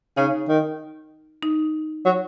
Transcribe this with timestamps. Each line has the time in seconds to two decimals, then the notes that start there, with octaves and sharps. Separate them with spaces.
0.17 C#3 D#4
0.48 D#3
1.43 D#4
2.05 F#3